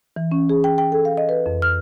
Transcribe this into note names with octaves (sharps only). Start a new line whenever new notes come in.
E3
C#4
G#4
G5
G5
A4
F5
D#5
B4
F2
F6